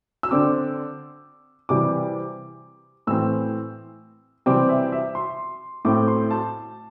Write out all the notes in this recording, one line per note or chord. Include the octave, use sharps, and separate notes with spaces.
E6
D3 C4 D6
C3 E3 G3 D6
A2 E3 C4 E6
C3 E3 G3 C4 D6
E5
E5
C6
A2 A3 C4 D6
C6
A5